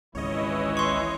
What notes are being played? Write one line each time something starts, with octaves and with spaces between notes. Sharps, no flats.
G#1 C#2 C#3 E3 E4 C#5 D#5
C6 C#6